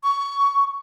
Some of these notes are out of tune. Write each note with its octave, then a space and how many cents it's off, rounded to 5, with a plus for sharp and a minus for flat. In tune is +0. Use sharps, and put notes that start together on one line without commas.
C#6 +15